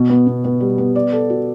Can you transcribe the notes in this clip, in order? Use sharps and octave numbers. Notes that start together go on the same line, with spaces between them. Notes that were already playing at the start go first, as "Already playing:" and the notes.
Already playing: B2
B3
B2
B3
G3
B3
D5
A4
F#4